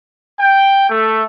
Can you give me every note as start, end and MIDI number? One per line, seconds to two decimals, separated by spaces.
0.40 0.86 79
0.90 1.23 57